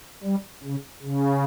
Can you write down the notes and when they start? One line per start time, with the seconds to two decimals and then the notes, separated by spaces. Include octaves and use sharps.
0.24 G3
0.64 C#3
1.02 C#3